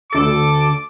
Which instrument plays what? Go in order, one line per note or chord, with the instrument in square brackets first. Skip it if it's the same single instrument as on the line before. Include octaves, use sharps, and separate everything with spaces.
[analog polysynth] D2 A4 D7 [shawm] D6